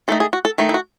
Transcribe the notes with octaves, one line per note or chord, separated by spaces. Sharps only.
D#3 A3 D#4 A4
G#4
F#4
A4
D#3 A3 D#4
E4
F#4